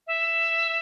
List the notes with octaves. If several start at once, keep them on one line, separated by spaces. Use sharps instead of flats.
E5